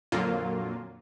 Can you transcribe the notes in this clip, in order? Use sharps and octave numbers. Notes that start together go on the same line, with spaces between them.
F2 A#2 D3 F#3 A#3 F4